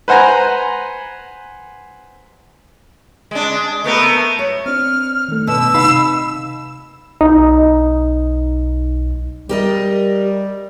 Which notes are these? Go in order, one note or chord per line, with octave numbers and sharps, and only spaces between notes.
B4 C5 F#5 G#5 A#5
G#3 D4
A3 B3 A#4
C#5
C4 D4 F6
D#3 A3
B2 D4 E6
C3 D#4 F5 F#5 B5
B1 D#4
G3 G4 A#4 D#5